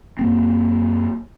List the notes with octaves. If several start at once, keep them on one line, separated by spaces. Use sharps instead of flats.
F#2 A#3 C4